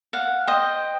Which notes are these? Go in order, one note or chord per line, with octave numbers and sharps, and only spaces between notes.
F5 F#5
C5 D#5 G5